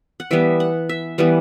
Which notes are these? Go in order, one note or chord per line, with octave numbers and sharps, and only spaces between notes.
F#5
E3 G3 B3 E5
F#5
E5
E3 G3 B3 F#5